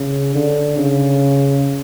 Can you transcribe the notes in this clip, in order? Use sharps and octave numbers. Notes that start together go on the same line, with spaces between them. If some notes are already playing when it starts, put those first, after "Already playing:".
Already playing: C#3
D3
C#3